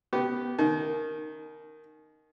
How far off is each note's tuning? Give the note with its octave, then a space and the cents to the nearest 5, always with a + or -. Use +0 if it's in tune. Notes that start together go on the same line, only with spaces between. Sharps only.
B3 +0 G4 -20
D#3 -5 G#5 +45